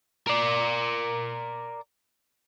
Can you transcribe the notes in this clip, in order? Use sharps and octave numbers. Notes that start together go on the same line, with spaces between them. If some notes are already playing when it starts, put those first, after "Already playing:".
A#4 D5